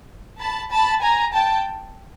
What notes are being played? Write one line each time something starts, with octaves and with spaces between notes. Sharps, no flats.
A5 B5
A5 B5
G#5 A#5
G5 A5